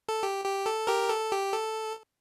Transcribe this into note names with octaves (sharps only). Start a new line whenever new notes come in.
A4
G4
G4
A4
G4 A#4
A4
G4
A4